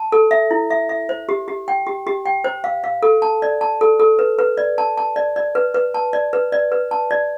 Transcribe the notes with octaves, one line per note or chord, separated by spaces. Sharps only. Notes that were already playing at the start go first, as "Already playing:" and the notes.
Already playing: A5
A4
E5
E4
E5
E5
C5
G4
G4
G5
G4
G4
G5
C5
F5
F5
A4
A5
D5
A5
A4
A4
B4
B4
D5
A5
A5
D5
D5
B4
B4
A5
D5
B4
D5
B4
A5
D5